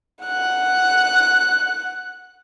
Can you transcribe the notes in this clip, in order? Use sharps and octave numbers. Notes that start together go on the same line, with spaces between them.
F#5 F#6